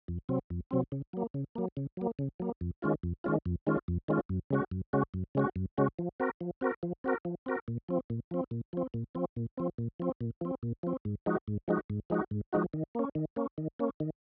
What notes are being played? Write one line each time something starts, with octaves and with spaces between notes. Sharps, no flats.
F2
C3 F#3 C4
F2
C3 F#3 C4
C#3
F#3 A#3
C#3
F#3 A#3
C#3
F#3 A#3
C#3
F#3 A#3
F2
D#3 G#3 C#4 F4
F2
D#3 G#3 C#4 F4
F2
D#3 G#3 C#4 F4
F2
D#3 G#3 C#4 F4
F#2
C#3 G#3 C#4 F#4
F#2
C#3 G#3 C#4 F#4
F#2
C#3 G#3 C#4 F#4
F#2
C#3 G#3 C#4 F#4
F3
C4 F#4 A#4
F3
C4 F#4 A#4
F3
C4 F#4 A#4
F3
C4 F#4 A#4
A#2
F3 C4
A#2
F3 C4
A#2
F3 C4
A#2
F3 C4
A#2
F3 C4
A#2
F3 C4
A#2
F3 C4
A#2
F3 C4
G#2
F3 G#3 D#4 F#4
G#2
F3 G#3 D#4 F#4
G#2
F3 G#3 D#4 F#4
G#2
F3 G#3 D#4 F#4
D#3
A#3 C#4
D#3
A#3 C#4
D#3
A#3 C#4
D#3